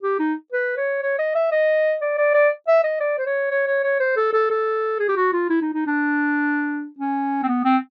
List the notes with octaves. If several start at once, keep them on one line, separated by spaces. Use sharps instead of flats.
G4
D#4
B4
C#5
C#5
D#5
E5
D#5
D5
D5
D5
E5
D#5
D5
C5
C#5
C#5
C#5
C#5
C5
A4
A4
A4
G#4
G4
F#4
F4
E4
D#4
D#4
D4
C#4
C4
B3
C4